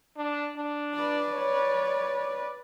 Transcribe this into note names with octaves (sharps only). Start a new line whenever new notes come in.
D4
D4
B4 D5
C#5